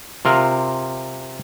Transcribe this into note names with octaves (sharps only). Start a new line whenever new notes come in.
C3 F4 A#4